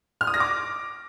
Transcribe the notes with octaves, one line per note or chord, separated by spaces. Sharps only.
F6
D#6
A#6
D6